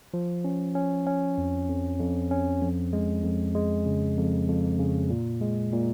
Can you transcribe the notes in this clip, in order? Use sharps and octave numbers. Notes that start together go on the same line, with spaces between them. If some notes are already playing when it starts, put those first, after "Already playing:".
F3
C#4
C#4
C#4
F2
F2
F2
C#4
F2
G#3
F2
G#3
C#3
F2
F2
C#3
A#2
G#3
A#2